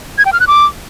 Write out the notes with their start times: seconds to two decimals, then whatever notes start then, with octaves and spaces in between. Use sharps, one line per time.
0.18 G#6
0.25 G5
0.33 F6
0.40 F#6
0.47 D6